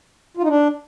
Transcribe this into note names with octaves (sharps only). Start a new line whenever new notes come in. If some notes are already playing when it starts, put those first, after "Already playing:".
F4
D#4
D4